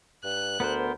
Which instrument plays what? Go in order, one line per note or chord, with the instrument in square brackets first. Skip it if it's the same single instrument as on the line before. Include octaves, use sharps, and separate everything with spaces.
[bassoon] G2 [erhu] F#6
[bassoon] D2 [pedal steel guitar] B3 A#4 C5